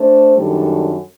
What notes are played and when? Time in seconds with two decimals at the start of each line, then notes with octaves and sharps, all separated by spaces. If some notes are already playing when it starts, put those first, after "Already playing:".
Already playing: A3 D4 A4 C5
0.37 F#2 D#3 G3 D4 A4